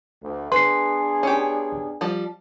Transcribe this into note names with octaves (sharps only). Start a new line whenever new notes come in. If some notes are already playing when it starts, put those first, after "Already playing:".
D2
B3 D4 G#4 B4 C6 C7
C#4 G4
F3 G3